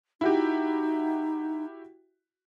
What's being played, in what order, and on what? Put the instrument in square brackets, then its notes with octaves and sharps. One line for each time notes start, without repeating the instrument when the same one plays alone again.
[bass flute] D#4 [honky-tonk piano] E4 F#4 G4